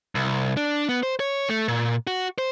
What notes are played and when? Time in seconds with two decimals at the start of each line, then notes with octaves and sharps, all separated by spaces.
0.15 C2
0.57 D4
0.89 B3
1.03 C5
1.20 C#5
1.49 A3
1.68 A#2
2.07 F#4
2.38 C5